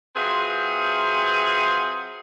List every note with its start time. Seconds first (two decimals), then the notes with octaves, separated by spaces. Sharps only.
0.15 F#3 C4 F4 G#4 B4 E5